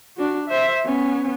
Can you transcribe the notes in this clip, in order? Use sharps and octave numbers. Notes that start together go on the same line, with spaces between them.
D4 F#4
C5 E5
B3 C#4